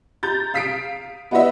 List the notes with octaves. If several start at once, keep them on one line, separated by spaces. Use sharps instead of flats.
A#5 G6 A6
F5 D#6 B6 C7 D7
B3 E4 F#4 B4 D#5 E5